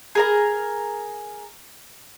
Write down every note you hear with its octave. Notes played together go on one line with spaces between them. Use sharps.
G#4 A#4 A#5